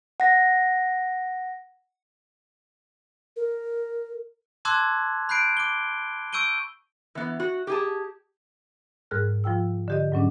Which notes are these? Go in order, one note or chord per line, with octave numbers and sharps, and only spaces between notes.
F#5 A#6
A#4
A5 C6 D6 E6 F#6 G#6
B5 F#6 G6 C7 D7
D6 G7
C#6 E6 G6 D7 D#7 G7
E3 B3
F#4
G4 G#4 A5
G#2 G3 G#4 A#4 F6 F#6
F3 F4 G5 E6
D3 G4 D#5
G#2 F#3 C#4 D4